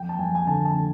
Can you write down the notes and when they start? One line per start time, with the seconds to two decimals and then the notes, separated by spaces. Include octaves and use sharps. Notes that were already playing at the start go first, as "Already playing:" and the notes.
Already playing: F2 G5
0.09 A5
0.19 F2 G#5
0.35 G#5
0.47 D3 A5
0.65 A5
0.74 D3